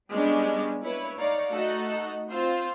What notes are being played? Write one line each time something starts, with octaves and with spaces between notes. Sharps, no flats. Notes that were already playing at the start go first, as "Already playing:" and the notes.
G3 G#3 B3 C#4 D4 G4
A#3 E4 B4 C#5
D#4 C#5 D5 F5 A#5
A3 D#4 F#4 A4 F#5
C4 F4 C5